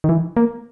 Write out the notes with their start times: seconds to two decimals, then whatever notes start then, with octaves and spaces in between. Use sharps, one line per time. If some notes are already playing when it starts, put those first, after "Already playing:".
0.04 D#3
0.09 E3
0.37 A#3